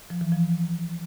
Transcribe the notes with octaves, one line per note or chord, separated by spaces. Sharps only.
F3
E3
F3